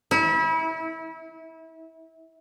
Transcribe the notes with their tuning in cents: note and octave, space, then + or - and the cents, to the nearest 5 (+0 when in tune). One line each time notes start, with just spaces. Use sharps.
E4 -30